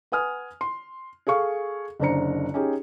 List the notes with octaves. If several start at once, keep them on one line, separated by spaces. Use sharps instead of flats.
B4 F#5 G#5 D#6 F6
C6
G#4 A4 F5 C#6
F#1 D3 D4 C5 A#5 C#7
C#4 D#4 G4 G#4